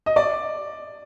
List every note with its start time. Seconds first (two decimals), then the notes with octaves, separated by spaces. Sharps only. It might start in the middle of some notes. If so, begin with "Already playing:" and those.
0.06 D#5
0.16 D5